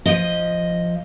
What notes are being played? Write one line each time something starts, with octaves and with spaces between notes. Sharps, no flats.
F3 D#5